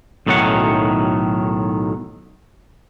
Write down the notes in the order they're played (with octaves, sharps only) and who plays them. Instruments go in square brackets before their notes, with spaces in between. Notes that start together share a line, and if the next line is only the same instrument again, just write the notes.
[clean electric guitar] B1 A2 D#3 F#3 C#4 F#5